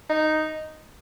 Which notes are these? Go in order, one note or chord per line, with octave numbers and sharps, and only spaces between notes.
D#4